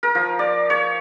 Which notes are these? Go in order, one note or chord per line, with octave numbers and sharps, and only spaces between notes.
A#4
F3
D5
C#5